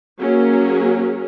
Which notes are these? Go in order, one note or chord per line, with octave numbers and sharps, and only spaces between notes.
F#3 A#3 C#4 G#4